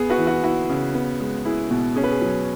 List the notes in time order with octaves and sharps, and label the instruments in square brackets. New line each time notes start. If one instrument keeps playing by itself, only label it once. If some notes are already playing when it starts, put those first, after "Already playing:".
Already playing: [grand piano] B3 G#4
F#4 B4
E3
F#4
E4 F#4
C#3
B3
G#3
E4 G#4
B2
C#4 G#4
B4
G#4
F#3